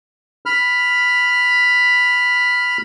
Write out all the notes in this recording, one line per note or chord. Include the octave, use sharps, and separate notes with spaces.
B5 F6